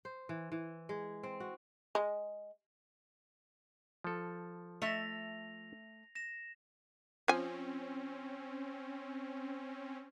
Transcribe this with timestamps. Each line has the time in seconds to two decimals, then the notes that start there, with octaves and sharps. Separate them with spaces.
0.05 C5
0.29 E3
0.52 E3
0.89 G#3
1.23 C4
1.40 F#4
1.95 G#3
4.04 F3 A4
4.82 A3 E5 A#6 F7
6.15 A#6 E7
7.28 F3 C4 C#4 G#5